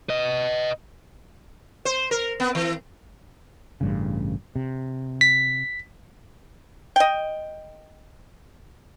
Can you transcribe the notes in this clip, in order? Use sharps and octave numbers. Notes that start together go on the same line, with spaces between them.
B4 D#5
C5
A#4
B3
E3
A1 G2 C#3
C3
B6
D#5 G5